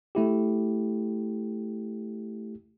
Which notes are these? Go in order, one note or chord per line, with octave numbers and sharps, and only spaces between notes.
A3 E4 G4